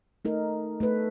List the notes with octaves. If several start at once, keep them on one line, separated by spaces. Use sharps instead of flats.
A3 D#4 A#4
A3 B4